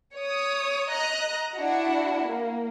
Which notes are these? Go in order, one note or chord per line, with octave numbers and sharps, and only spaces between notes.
C#5 D#6
D#5 A#5 F#6
D4 E4 F#4 F#5
A#3